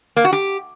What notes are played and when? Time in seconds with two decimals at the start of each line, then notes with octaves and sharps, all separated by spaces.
0.16 A#3
0.25 F#4
0.33 G4